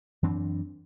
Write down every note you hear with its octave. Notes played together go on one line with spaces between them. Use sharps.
F#2 E3 C4 D4